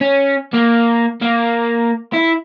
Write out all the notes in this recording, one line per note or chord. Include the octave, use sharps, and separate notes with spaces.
C#4
A#3
A#3
E4